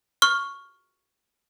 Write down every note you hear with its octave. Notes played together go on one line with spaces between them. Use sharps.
C#6 F6 G7